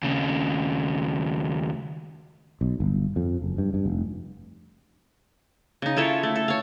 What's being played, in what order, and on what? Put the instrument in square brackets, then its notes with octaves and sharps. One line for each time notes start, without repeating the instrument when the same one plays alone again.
[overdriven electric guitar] D#2 C#3
[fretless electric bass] B1
G1
F2
F#1
G2
G2
F1
[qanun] C#3 D#4
E4 F4 A4 C#5
A3
A4
C#5 F5